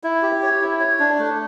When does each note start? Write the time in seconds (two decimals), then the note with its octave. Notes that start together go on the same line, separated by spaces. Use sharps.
0.04 E4
0.23 G4
0.42 C#5
0.61 E4
0.80 C#5
0.99 D4
1.19 A3